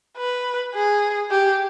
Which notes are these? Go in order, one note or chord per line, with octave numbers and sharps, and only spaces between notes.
B4
G#4
G4